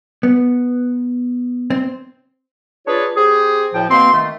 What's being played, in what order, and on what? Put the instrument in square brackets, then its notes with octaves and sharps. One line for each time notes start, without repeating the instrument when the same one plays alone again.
[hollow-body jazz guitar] B3
C4
[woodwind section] D4 F4 G#4 B4 C#5
C4 G4 G#4
F#2 A2 F3 G5
B2 A#3 C4 C6
D#3 A3